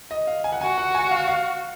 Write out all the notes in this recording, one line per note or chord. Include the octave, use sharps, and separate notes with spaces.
D#5
F5
G#5
F#5
F#4 G#5
F#5
G#5
F5
F5